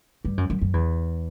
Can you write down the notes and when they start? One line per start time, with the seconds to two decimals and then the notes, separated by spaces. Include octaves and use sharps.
0.25 G2
0.37 F#2
0.50 F#2
0.61 F#2
0.73 E2